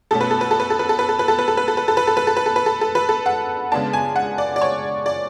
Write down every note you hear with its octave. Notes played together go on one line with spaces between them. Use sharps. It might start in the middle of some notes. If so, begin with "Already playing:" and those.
B2 A3 C#4 A4
B4
A4
B4
A4
B4
A4
B4
A4
B4
A4
B4
A4
B4
A4
B4
A4
B4
A4
B4
A4
B4
A4
B4
A4
B4
A4
A4
B4
A4
F#5
C#3 G#3 B3 D4 A5
G#5
F#5
D5
D5
C#5
D5